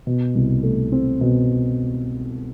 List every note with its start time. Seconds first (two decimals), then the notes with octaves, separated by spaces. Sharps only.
0.07 B2
0.35 C2
0.63 A3
0.92 C4
1.21 B2